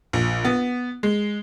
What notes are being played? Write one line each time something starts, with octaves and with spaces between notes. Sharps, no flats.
A#1
B3
G#3